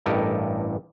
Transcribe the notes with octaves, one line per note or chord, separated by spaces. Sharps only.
A1 G2 G4 A4 A#4 D#5